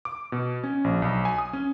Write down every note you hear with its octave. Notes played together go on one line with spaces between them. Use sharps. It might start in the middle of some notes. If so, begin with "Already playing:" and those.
D6
B2
C#4
A#1
B1
G#5
D#6
C#4